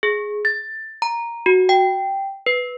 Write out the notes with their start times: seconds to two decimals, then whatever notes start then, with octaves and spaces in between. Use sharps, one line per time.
0.03 G#4
0.45 A6
1.02 A#5
1.46 F#4
1.69 G5
2.46 B4